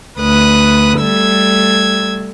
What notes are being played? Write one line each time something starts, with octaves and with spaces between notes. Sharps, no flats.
D2 B4 D#6 F#6
G3 A3 E6 G#6